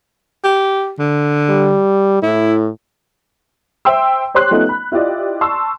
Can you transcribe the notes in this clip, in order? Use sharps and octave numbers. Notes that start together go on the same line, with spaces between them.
G4
D3
G3
A2 E4
C5 E5 G5 C6 E6
G4 C5 C#5 C6 F#6
F3 A3 B3 C#4 D#4 D#5
B5
E4 F4 G4 D5 D#5
A5 C6 C#6 E6